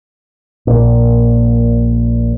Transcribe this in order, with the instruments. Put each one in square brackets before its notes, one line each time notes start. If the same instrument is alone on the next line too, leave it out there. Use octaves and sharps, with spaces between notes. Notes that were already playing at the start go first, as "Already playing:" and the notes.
[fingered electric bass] A#1 A#2